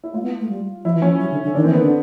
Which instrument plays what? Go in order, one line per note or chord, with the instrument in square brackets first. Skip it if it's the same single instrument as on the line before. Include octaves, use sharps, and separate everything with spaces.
[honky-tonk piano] E4
[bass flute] A3 [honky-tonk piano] F4
[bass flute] B3
A3
G3
[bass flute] F3 [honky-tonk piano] E4
[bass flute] E3
[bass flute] F3 [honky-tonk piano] C#4
[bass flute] F#3
D3
D3
[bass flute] D#3 [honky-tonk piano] D4
[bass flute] E3 [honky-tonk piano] C4
[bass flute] D#3 [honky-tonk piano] B3
[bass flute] D3